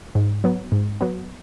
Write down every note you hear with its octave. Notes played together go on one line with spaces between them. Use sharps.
G#2
F#3 B3
G#2
F#3 B3